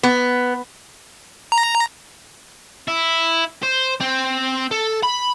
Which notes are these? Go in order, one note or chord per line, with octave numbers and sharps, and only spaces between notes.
B3
A#5
E4
C5
C4
A4
B5